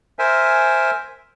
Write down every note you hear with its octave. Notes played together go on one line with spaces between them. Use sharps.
A#4 C5 E5 G#5